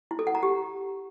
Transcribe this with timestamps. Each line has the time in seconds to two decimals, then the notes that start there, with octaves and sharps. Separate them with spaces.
0.11 E4
0.19 A4
0.27 F#5
0.35 A#5
0.43 G4